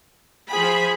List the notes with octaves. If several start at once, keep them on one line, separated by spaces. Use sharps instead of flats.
F3 G#4 C5 B5